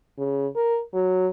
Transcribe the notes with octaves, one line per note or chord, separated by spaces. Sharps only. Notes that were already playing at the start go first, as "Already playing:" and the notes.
C#3
A#4
F#3